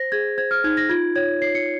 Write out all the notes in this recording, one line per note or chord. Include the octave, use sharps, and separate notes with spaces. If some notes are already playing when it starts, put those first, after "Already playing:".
Already playing: C5 A#6
G#4 G#6
C5 G#6
F6
D#4 G#6
A#6
F4 G#6
C#5 G#6
C#5 C7
C#7